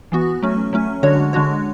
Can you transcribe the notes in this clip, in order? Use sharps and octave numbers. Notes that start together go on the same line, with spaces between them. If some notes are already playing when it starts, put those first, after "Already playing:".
E3 B3 F#4
F#3 A3 C#4
F#3 A3 C#4
D3 G#3 D4 F#4 C#5
D3 G#3 D4 F#4 C#5